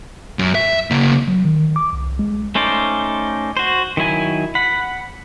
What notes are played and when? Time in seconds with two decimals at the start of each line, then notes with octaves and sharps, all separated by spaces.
0.39 F#2
0.55 E5
0.91 C#3 A#3
1.28 F#3
1.45 D#3
1.76 D6
1.93 C2
2.19 G#3
2.55 A3 C#4 D#4 C5 D5
3.57 F#4 C5
3.97 D#3 F#3 E4 G#5
4.55 F#5 B5